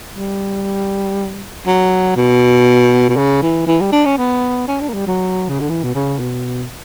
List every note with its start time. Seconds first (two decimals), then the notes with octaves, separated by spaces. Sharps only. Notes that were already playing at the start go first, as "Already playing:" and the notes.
0.16 G3
1.66 F#3
2.16 B2
3.09 B2
3.17 C#3
3.42 E3
3.67 E3
3.81 G3
3.92 D4
4.05 C#4
4.18 B3
4.68 C#4
4.81 D4
4.89 A#3
4.94 G3
5.07 F#3
5.50 C#3
5.60 D3
5.69 E3
5.83 B2
5.95 C#3
6.19 B2